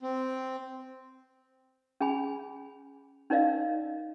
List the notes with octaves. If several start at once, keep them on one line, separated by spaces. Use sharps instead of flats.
C4
C#4 G#4 G#5 B5
C#4 D#4 A#4 D5 D#5 F5